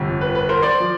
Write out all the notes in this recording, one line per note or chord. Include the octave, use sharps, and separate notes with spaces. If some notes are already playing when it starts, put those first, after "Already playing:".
Already playing: G1 F2 C3
B4
B4
A#4 C5
C5 D5
F3